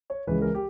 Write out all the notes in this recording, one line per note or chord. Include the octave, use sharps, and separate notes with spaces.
C#5
C#2 C#3 E3 B4
A#4
G4